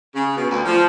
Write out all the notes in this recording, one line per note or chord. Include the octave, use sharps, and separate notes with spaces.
C#3
B2
D2
F3